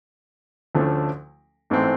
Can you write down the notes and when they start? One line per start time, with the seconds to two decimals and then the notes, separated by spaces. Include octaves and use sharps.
0.75 D2 D3 F3 A3 C#4
1.70 A1 G#2 E3 A3 C4